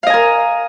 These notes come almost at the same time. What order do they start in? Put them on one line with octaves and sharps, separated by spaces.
F5 D#5 G#5 A#4